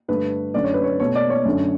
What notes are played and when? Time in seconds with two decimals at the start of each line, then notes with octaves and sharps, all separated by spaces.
0.08 G2 D3 A3 B4
0.54 F#2 D3 A3 D5
0.64 C#5
0.74 B4
0.84 C#5
1.00 B2 A3 C#5
1.15 D5
1.30 C#5
1.45 F#2 D3 A3